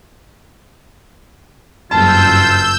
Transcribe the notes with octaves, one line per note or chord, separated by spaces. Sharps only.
F#1 G2 F4 A5 E6 G6